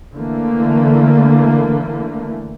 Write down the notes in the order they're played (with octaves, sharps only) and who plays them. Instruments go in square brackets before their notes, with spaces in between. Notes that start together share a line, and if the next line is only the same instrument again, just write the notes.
[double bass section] D3 E3 A3 A#3